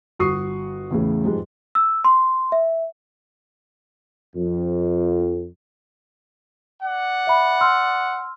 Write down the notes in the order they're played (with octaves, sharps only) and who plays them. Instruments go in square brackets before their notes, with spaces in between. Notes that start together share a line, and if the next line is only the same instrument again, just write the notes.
[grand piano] G1 F#4 C#6 D#6 C7
E2 A2 C#3
F2 G#2 G3 G#3
[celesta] E6
C6
E5
[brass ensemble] F2
[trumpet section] D5 F#5
[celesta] E5 B5
C6 E6 F6